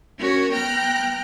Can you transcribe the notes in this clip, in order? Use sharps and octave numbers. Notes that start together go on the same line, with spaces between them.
C#4 F#4 A#4 C#5
B3 G5 A#5 F6 F#6